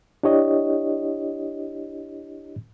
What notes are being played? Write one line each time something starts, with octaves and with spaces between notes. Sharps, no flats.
D4 E4 G4 C#5 D#5